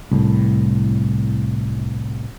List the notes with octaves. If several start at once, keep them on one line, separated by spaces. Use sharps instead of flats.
C2 A2